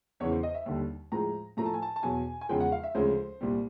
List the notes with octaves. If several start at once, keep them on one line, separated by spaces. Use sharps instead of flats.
E2 C#3 E3 C#5
C5
D#5
E5
D#2 D3 G3
A2 F3 G#3 A#5
A2 F3 A3 A#5
A5
G#5
A5
A5
E2 B2 F#3 G#5
G#5
E2 C#3 F3 G#3 G5
F#5
F5
E5
D2 C#3 F3 G#3 C5
C2 A#2 G3